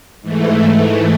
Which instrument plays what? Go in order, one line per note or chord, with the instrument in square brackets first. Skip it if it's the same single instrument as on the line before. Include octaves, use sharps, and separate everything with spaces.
[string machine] G#2 E3 A3